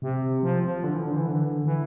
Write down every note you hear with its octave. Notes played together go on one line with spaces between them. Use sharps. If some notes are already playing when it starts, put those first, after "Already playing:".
C3
F3
F3
D3
E3
D3
E3
D3
E3